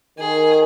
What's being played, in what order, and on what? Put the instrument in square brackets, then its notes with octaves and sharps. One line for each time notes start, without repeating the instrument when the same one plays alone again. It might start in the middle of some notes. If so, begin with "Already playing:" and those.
[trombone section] D#3 [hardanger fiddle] G#4